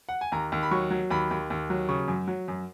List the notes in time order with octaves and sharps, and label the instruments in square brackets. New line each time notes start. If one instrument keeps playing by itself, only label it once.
[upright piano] F#5
G#5
D#2 A#5
D#2
B5
F#3 C#6
F#3
D#2 B5
D#2
D#2
F#3
C#3 C#6
F#2
F#3
F#2